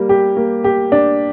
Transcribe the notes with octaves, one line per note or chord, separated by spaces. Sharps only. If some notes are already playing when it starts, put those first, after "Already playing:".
Already playing: G3 A#3
G4
A#3
G4
D4